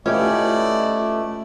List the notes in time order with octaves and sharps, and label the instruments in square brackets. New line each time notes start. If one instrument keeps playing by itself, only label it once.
[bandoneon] A3 [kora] C#4 G4 [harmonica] E4 D5 [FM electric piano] F4 B4 D#5